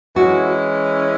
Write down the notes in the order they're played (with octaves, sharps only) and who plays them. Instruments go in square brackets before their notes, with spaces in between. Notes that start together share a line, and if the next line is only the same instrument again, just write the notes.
[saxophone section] E3 G#3 C#4 E4 [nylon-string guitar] F#4